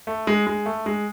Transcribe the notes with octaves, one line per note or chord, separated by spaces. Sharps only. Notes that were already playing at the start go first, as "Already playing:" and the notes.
A3
G#3
G#3
A3
G#3